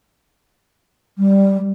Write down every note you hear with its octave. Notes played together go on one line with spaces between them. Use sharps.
G3